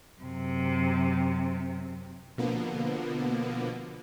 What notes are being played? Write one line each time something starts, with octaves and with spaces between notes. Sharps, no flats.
F#2 C3
B2 D3 F3 A#3 B3